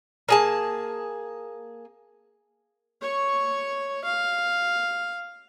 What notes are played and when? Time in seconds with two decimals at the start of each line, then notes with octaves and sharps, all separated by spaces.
0.29 A#3 G#4 A5
3.01 C#5 C#6
4.04 F5